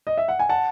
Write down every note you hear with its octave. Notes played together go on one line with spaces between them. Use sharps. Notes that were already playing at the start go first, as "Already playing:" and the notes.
D#5
E5
F#5
G#5
F#5 A5